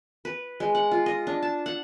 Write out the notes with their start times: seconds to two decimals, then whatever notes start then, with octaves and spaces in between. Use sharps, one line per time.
0.25 B4
0.60 G#3
0.75 F#5
0.91 F4
1.06 D#5
1.27 D4
1.42 A5
1.66 F#5